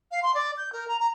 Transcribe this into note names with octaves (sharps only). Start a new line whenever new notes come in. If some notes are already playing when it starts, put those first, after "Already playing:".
F5
C6
D5
G6
A#4
A#5
A#5